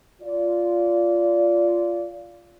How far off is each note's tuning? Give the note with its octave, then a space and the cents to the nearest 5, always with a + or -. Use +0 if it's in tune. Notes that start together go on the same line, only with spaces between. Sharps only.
F4 -5 D5 -20